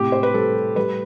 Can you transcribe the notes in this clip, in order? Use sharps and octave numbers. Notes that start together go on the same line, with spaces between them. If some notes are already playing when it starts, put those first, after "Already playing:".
Already playing: A2 C3 G4
C5
B4
G3 A4
G3 B4